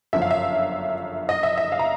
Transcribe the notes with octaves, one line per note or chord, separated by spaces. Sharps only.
G1 F#2 D3 F3 E5
F5
E5
D#5
E5
E5
F5
A#5